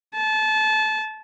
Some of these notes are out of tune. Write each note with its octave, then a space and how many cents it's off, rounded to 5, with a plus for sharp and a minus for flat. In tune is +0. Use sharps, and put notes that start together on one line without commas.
A5 -25